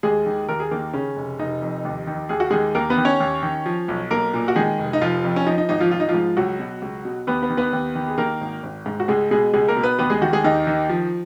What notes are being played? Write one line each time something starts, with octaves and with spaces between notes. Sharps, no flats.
D#2 G#3 G#4
D#3
D#2 A#4
G#4
D#3 A#3 A#4
C#3 C#4
F1
F1 D#4
F2
D#2
D#3
D#2 G#4
F#4
D#3 G#3 G#4
D#2 A#3 A#4
B3 B4
D#3
C#4 C#5
D#2
D#3
F3
B1
B1 A#3 A#4
A#2
F#4
D#3 G#3 G#4
F1
D#4
F1 F3 F4
F2
C#4
F3 D#4
D#4
G#1 D#4
F3 F4
G#1 F4
D#4
F3 F4
G#2
C#2 F#3 F#4
B2
C#2
B2
D#2 B3 B4
B3 B4
D#3
B3 B4
D#2
D#3
G#4
D#3 A#3 A#4
G#1
G#1
G#2
F#4
C#2 G#3 G#4
B2 G#3 G#4
C#2 G#3 G#4
A#3 A#4
B2
B3 B4
D#2 B3 B4
G#3 G#4
D#3 F#4
G#3 G#4
D#2 D#4
D#3
F3